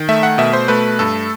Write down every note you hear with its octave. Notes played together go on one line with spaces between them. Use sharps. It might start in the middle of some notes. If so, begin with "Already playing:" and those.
Already playing: D#3
A3 E5
F#5
B2 E5
C5
A3 B4
G2 A4